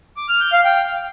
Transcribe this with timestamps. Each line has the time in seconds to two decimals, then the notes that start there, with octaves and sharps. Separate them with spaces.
0.17 D6
0.29 F6
0.41 G6
0.52 F5
0.64 G5